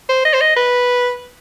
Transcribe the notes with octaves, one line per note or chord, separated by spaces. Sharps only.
C5
D#5
C5
D#5
B4